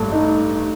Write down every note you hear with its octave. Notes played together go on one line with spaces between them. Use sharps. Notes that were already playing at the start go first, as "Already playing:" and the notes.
Already playing: A1 G2 A3
D#4